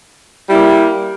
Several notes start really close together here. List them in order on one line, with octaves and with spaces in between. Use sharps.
G3 E4 A#3